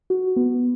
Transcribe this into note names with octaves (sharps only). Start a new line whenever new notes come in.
F#4
B3